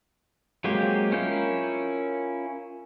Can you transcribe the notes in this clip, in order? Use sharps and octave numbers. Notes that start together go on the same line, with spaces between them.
F#3 G#3 A#3 C4 G4
C#4 E4 F4 A#4 G6